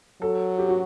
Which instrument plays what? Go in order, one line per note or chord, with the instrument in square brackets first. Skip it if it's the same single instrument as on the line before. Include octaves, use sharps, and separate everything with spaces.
[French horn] F#3 [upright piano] A4
[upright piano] G4
F#4